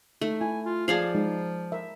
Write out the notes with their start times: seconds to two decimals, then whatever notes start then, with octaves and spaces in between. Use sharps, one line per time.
0.21 A3 D#4
0.41 E4 G#5
0.65 F4
0.88 F3 F4 G#4 D5 F5 A5
1.15 G#3 D#4
1.72 A#4 E5